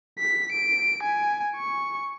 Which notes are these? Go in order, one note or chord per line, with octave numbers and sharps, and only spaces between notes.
B6
D7
G#5
C#6